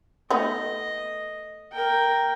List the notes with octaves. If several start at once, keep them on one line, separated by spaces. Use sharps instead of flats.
A3 B3 D#4 D#5
A#4 G5